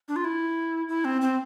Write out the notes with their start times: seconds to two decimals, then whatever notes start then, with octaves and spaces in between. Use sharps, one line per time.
0.08 D4
0.16 F4
0.24 E4
0.89 E4
1.05 C4
1.21 C4